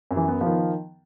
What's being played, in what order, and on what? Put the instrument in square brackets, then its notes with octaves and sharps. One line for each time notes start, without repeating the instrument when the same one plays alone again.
[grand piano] F#2
[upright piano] E3
[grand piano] B3
[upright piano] F3
[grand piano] D#3